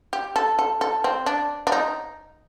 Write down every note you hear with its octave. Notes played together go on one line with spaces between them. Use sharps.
G4
A4
A4
A4
C4
D4
D4
D#4